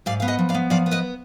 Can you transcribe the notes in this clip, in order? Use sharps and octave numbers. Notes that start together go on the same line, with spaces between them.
G#2 D5 F5
B3 F5
D#5 F#5
F3
D5 F5
B3
F3 D5 F5
B3
B4 D#5